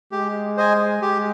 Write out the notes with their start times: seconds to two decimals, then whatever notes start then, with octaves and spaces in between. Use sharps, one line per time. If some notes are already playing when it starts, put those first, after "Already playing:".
0.12 G#3 G4
0.57 C5 D#5 G#5
1.02 G#3 G4